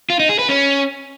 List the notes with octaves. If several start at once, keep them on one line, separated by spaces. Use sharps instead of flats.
F4
D#4
G#4
B4
C#4